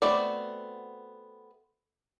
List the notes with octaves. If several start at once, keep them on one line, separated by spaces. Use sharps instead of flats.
A3 B3 C4 F#4 D5